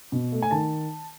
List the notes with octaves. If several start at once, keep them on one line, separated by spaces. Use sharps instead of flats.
B2
A3
G#5
D#3 A5